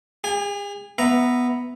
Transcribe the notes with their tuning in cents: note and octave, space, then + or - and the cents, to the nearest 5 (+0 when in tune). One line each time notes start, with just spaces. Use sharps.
G#4 -45 G#5 +0
B3 +0 E5 +0 A#5 +0